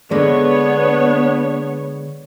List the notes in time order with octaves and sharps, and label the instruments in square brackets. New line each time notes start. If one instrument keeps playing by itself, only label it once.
[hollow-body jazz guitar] D3 G#3 [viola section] B3 C#5 [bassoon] D4